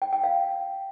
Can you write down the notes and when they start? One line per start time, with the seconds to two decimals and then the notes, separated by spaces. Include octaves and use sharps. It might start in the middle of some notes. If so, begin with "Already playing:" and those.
0.02 G5
0.13 G5
0.24 F5